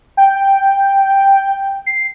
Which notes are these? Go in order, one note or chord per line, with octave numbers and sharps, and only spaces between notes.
G5
C7